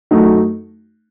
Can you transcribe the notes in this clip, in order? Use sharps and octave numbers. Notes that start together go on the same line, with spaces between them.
F#2 F#3 A3 D#4 F#4